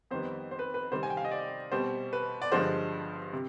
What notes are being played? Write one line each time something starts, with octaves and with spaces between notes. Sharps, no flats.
F2 D#3 G3 B3 C5
C5
B4
B4
C3 D#3 G3 C4 C5
G#5
G5
F5
D#5
D5
B2 G3 C4 C5
B4
D5
G2 D3 F3 G#3 C5
C3